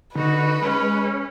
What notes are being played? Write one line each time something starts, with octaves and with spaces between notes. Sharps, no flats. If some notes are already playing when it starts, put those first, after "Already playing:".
D3 D#4 F#4 B4
G#3 C#4